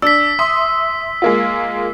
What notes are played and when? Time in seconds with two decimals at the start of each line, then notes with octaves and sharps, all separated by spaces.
0.02 D4 E6 B6
0.39 E5 C6 D#6
1.22 G#3 A#3 F4